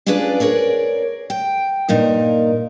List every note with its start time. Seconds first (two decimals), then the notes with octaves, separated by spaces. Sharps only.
0.06 C#4 D4 F4 G#4 B4 D5
0.40 G#4 A#4 C#5 D5
1.30 G5
1.89 G2 A#2 D#4 A#4